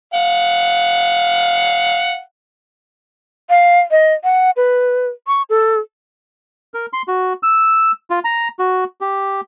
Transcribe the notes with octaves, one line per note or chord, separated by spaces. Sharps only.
F5 F#5
F5
D#5
F#5
B4
C#6
A4
A#4
C6
F#4
E6
F4
A#5
F#4
G4